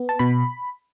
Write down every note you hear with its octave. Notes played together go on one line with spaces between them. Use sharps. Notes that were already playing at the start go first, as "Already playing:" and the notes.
Already playing: B3
A5
B2 B5